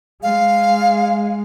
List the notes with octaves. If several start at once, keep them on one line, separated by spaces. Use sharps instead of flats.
G#3 F5